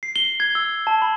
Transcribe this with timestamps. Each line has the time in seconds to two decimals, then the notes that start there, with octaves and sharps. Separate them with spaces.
0.03 C7
0.16 G7
0.40 G#6
0.55 E6
0.87 A5
1.02 B5